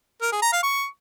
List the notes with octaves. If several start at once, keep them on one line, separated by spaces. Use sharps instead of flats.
A#4
G#4
A#5
F5
C#6